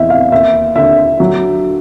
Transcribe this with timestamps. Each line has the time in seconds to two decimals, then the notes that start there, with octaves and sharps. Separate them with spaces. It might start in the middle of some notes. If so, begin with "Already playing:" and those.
Already playing: E2 E3 D#5 E5
0.10 F5
0.31 D#2 E5
0.76 D3 E5
1.20 F#3